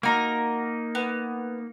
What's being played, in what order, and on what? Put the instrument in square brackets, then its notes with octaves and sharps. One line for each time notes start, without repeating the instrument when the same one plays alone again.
[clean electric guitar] A#3 D#4 [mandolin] F#4 A#4
[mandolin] B3